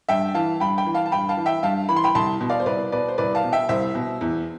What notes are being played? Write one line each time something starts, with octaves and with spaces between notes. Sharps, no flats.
G2 E5 G5
E3 F5 A5
G2 G5 B5
G5 B5
E3
F5 A5
A5
G2 G5 B5
F5 A5
E3
E5 G5
G2 F5 A5
E3 B5
C6
G5 B5
C2 A5 C6
B2
D5 F5
C5
C2 B4 D5
B2 B4 D5
C5
C2 B4 D5
F5 A5
B2
E5 G5
C2 C5 E5
B2
E2